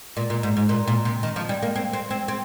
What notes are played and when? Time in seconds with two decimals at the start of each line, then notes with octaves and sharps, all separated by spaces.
0.17 A#2
0.30 A#2
0.43 G#2
0.57 G#2
0.69 A#2
0.87 A#2
1.05 C3
1.23 D#3
1.36 F3
1.49 G3
1.62 A#3
1.76 C4
1.93 C4
2.11 C4
2.28 C4